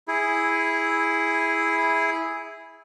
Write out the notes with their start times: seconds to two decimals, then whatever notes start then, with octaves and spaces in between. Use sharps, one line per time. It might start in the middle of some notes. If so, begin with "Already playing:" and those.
0.08 E4 G#4